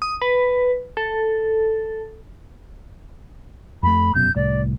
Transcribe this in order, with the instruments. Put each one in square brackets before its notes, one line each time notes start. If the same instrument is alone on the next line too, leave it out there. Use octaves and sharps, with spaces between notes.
[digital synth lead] D#6
B4
A4
[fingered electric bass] F2 A3 [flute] B5
[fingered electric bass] F1 F#2 B2 [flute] G6
[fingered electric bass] C2 A2 [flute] D5